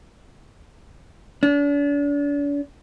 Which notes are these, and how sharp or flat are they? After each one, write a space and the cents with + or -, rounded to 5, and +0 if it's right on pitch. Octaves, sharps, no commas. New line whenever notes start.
D4 -40